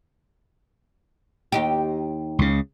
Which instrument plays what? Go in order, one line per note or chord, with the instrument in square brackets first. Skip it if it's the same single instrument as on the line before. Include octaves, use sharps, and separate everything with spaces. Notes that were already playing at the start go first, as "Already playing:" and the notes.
[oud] D#2 D#4 G4
[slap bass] C#2 C#3